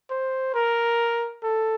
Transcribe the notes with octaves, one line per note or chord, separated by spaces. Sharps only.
C5
A#4
A4